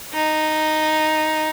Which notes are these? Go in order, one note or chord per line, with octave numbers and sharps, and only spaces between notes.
D#4